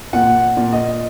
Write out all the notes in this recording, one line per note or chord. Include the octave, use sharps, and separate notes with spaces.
A#2 F#5
A#2
D#5